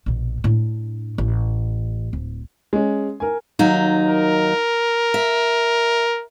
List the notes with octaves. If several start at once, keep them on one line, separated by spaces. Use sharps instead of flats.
A#1 B2
A2 D4
A1
D1
G#3 C#4
A#4 G#5
D#2 F#3 D#4
A#4
E5